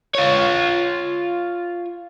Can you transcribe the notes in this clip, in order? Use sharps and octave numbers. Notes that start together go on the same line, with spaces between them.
F4 C#5